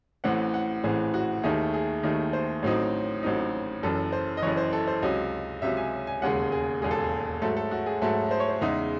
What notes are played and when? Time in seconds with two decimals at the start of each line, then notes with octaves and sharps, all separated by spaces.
0.24 A1 A2 E3 C4 F#5
0.54 F#5
0.84 A1 A2 E3 C4 G#4
1.14 F#4
1.44 D#2 D#3 A3 D#4 G#4
1.73 G#4
2.03 D#2 D#3 A3 D#4
2.33 C5
2.62 A1 A2 F#3 C4 D#4
3.23 A1 A2 F#3 C4 D#4
3.83 F#1 F#2 E3 A4
4.12 C5
4.37 D#5
4.42 F#1 F#2 E3 C#5
4.57 C5
4.73 A4
4.87 C5
5.02 C#2 C3 F#3 C#4 D#5
5.62 C#2 C3 F#3 C#4 E5
5.77 G#5
6.07 G#5
6.22 E1 D#2 C#3 G#3 F#5
6.52 G#4
6.82 E1 D#2 C#3 G#3 G#4
6.91 A4
7.01 G#4
7.42 G#2 F#3 A3 A4
7.57 A4
7.71 F#4
7.86 G#4
8.02 G#2 F#3 A3 A4
8.31 C5
8.40 C#5
8.49 C5
8.61 E2 C#3 G#3 D#4 E5